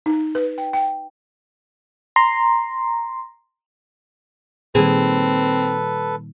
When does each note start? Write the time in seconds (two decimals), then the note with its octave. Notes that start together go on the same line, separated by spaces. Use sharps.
0.06 D#4
0.35 B4
0.58 G5
0.73 G5
2.16 A#5 C6
4.75 A#2 D#3 G3 C4 G#4 A4 B4